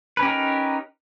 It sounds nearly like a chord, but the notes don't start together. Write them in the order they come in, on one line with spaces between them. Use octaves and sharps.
B4 C#4 G4 D#4 A#4